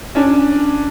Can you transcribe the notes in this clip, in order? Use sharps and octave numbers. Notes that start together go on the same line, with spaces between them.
C#4 D4